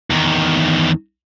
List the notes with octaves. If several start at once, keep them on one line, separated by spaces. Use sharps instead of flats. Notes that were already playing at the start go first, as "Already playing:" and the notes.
E2 D#3